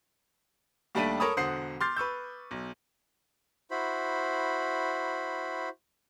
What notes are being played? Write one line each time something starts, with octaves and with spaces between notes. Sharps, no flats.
D#2 G3 A3 D4 B6 D#7
A4 A#4 C#5 A5 B5 D#6
E1 D3 C5 F#5 D#6 C7
C6 D6 F6 G6 A6 C7
B4 C#6 E6 G6
B1
E4 F#4 C5 B5